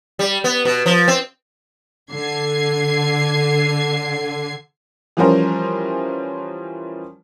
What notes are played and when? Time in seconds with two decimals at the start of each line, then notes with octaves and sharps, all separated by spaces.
0.19 G3
0.44 B3
0.65 B2
0.86 F3
1.08 C4
2.12 D3 G#6 C7
5.17 E3 F3 G3 C#4 A#4 C5